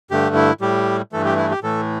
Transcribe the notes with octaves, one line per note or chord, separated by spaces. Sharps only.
G2 D3 A3 G4
E4
A2 G3 G4
G2 E3 A3 A4
G4
E4
G4
A2 E3 A3 A4